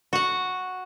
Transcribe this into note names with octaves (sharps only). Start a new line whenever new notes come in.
F#4 F#5